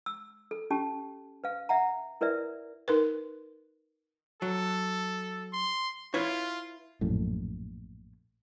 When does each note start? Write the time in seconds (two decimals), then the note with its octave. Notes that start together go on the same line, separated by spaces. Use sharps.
0.06 E6
0.51 A4
0.70 C#4 G4 A5
1.44 B4 F5
1.69 E5 F#5 A#5
2.21 E4 A#4 B4 D5 E5
2.88 D#4 A#4 B4
4.42 F#3 A4
5.53 C6
6.14 E4 F4 B4 C#5
7.01 A#1 F#2 A2